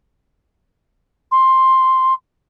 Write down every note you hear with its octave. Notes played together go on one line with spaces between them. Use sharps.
C6